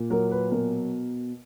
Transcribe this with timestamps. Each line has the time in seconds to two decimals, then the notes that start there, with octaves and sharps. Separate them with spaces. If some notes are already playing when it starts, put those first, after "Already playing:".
Already playing: A#2
0.10 F#3 A#4
0.31 B4
0.51 B2 A#4